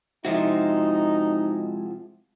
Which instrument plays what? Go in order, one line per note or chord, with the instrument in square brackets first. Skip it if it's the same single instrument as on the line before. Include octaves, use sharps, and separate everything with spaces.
[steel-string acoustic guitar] C3 F3 [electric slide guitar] G#3 E4 F#4 [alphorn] D#4